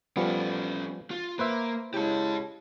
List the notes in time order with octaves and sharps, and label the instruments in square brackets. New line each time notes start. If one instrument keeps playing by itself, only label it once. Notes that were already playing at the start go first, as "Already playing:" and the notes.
[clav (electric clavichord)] F3 G3 B3 [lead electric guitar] C#4 A4
[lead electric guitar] F4
[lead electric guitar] A#3 [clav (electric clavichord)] B4 C5 E5
[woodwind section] C#3 G#3 E4 [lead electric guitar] G4 A5